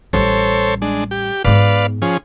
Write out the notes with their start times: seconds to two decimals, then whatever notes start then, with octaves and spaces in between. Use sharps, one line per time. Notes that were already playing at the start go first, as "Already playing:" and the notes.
0.13 A1 G3 A4 C5 C#5
0.82 G#3 D4
1.11 G4
1.45 G#2 B3 B4 D5 F5
2.02 F3 C#4 G#4